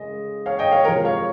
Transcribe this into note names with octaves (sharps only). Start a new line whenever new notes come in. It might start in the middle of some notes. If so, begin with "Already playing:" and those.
Already playing: C#3 G#3 D#5
C#5 F5
D#5 G5
C#5 F5
C3 F3 G#3 A#4 C#5
C#5 F5